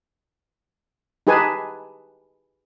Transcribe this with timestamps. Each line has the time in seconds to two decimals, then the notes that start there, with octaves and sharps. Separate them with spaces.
1.27 D#4 G4 G#4 B4 G#5 A5